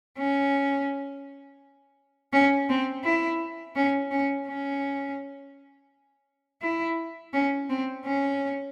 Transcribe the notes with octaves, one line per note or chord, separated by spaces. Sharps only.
C#4
C#4
C4
E4
C#4
C#4
C#4
E4
C#4
C4
C#4